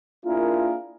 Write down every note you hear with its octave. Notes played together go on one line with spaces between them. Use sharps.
A#3 D4 E4 F4 G#4 A#4